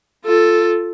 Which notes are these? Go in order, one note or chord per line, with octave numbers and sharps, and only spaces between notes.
F4 A4